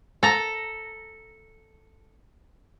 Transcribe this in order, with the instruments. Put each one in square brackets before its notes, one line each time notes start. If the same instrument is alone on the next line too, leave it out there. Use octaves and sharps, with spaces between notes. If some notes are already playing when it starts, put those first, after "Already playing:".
[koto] A4 A#5